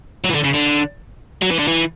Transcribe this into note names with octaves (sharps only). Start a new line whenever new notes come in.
F#3
E3
D3
C#3
D3
F#3
E3
D3
E3